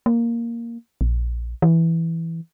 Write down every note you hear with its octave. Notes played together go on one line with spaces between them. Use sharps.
A#3
A#1
E3